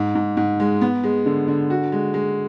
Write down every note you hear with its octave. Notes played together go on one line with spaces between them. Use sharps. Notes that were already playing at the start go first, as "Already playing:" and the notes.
Already playing: G#2
G#2
G#2
G#3
B3
G#3
D3
D3
F#4
G#3
G#3